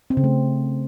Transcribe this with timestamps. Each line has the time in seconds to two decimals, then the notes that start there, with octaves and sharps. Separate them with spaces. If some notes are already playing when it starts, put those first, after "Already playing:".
0.10 C4
0.17 C#3
0.24 A3